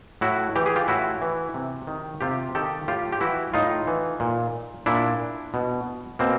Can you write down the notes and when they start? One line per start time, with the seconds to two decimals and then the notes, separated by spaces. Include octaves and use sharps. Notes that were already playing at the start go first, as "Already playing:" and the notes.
0.21 A2 E4 F#4
0.56 E3 G4
0.66 G#4
0.76 F4 G4
0.88 A2 E4 F#4
1.22 E3
1.54 C3
1.87 D#3
2.21 C3 F4 G4
2.55 D#3 G4 A4
2.88 A2 F4 G4
3.12 G4
3.20 E3 E4 F#4
3.54 A2 D#4 F4
3.87 E3
4.20 A#2
4.86 A#2 D4 E4
5.54 B2
6.19 B2 A#3 C4